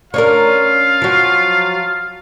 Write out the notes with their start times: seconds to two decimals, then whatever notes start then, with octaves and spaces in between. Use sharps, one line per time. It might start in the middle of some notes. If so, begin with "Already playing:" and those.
0.14 C#4 D4 F4 A#4 F5
1.02 F3 F#3